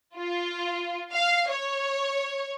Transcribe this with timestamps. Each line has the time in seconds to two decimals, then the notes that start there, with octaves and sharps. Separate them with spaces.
0.15 F4
1.12 F5
1.50 C#5